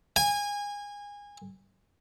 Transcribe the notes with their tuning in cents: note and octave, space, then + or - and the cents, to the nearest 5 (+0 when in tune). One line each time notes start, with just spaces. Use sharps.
G#5 -25